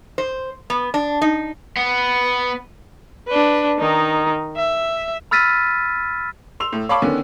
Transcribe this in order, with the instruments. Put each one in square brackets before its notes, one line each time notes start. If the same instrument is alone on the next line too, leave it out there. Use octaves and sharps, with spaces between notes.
[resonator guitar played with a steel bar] C5
B3
D4
D#4
[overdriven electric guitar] B3
[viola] D4 B4
D#3 D#4
E5
[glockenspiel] B5 E6 F6 A6 B6 D#7
[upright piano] C6 E6 F7
A2
C#5 F5 A5 B5 C#6 D6
D3 D#3 B3 C#4